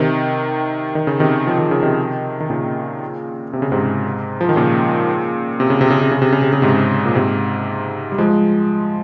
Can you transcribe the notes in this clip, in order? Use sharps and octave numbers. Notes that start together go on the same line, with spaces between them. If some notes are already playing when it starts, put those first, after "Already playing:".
Already playing: C3 D#3
D#3
C#3
C3 D#3
F3
D#3
C#3
C3 D#3
D#3
A#2 C#3
C3
C#3
G#2 C3
F3
D#3
A#2 C#3
C3
C#3
C3
C#3
C3
C#3
C3
C#3
C3
C#3
G#2 C3
A#2
G#2 C3
G3
F3 G#3